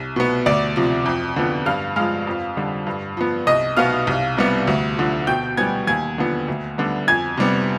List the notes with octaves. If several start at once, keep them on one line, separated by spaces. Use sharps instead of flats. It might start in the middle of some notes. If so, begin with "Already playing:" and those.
Already playing: C2
B2 B3
D2 D5 D6
C3 F3
F2
D3 F3 B3
G2 F5 F6
F3 G#3 F5 F6
F2
D3 G3
G2
F3 B3
C2 D#5 D#6
B2 B3 F5 F6
C2
C3 G3 B3
D2
D3 F3
B2 G5 G6
G3 B3 G#5 G#6
D#2 G#5 G#6
D3 F3 B3
D2
D3 G3 B3
F2 G#5 G#6
C3 G3 B3